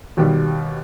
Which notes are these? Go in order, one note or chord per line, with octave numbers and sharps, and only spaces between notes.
D#2 B2 D#3 G3